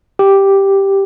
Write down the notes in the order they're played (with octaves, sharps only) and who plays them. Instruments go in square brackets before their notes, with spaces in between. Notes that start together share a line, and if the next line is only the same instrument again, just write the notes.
[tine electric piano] G4